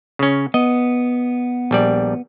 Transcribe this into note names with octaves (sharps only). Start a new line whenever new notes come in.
C#3 C#4
B3 D#5
A#1 G3 D5